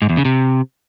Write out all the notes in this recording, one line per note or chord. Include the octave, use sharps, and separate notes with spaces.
G#2
E2
C#3
C3